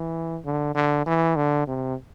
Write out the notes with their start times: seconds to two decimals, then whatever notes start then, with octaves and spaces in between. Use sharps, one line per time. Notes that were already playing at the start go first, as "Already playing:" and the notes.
Already playing: E3
0.45 D3
0.75 D3
1.06 E3
1.36 D3
1.67 C3